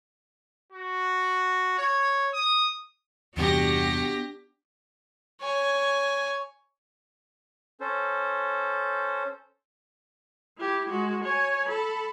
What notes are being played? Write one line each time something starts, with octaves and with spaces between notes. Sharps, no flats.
F#4
C#5
D#6
E2 G2 C3 B3 D4 F#4 G4 A#6
C#5 G#5
C#4 A4 C5
E4 G4
G#3 F#4
C#5 G#5
A4 B5